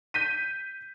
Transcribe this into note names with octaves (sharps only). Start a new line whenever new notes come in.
G6 B6 D#7